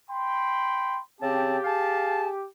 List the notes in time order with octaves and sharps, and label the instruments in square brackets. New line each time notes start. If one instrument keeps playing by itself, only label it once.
[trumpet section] G5 B5 C6
[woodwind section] C#3 C4 A5 [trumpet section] G4
[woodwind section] G#4 F5 A5